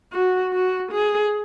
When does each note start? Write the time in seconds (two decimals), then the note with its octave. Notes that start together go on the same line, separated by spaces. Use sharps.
0.13 F#4
0.53 F#4
0.92 G#4